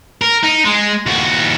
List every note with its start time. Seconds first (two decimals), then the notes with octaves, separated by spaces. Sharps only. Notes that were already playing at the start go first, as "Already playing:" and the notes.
0.22 A#4
0.43 D#4
0.65 G#3
1.07 D#2 F#4